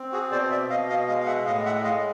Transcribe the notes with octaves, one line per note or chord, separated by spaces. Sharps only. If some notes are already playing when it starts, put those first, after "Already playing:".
Already playing: C4
F#4 G#4
B2 C5 D5
D5 E5
B2 D#5 F5
D#5 F5
G#3 D#5 F5
F5
E5 F#5
A2 D#5 F5
E5 F#5
G#3 D#5 F5